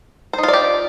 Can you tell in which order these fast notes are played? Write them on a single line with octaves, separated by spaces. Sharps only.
C5 D#4 F4 D5 G4